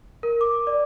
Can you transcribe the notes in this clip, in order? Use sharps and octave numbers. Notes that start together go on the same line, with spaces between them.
A#4
D6
D5